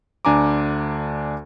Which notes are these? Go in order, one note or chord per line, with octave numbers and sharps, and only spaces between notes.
D2 D4 G#5 A#5 D6